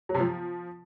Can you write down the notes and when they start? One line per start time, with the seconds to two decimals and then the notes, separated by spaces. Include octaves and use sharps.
0.09 F#3
0.14 C3
0.20 F3